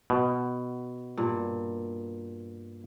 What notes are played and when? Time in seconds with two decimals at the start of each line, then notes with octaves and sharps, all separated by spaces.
0.10 B2
1.17 G2 A#2